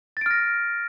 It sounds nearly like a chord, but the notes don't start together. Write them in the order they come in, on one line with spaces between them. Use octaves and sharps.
A6 D7 F6 A#6